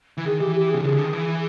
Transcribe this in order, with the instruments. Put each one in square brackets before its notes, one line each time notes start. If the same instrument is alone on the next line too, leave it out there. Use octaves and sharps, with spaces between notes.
[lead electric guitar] E3
[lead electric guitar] D#3 [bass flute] G#4
[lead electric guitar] E3 [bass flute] G4
[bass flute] G4
[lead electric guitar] C3 [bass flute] G#4
[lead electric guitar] C#3 [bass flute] G#4
[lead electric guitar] D3
D#3
E3